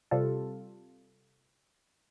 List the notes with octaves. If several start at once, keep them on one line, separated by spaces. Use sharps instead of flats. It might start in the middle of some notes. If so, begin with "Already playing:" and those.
C3 G3 F4 A4